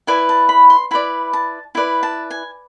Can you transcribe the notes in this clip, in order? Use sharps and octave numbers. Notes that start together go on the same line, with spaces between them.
E4 B4 D5 G#5
A5
B5
C6
E4 B4 D5 B5
A5
E4 B4 D5
A5
G#5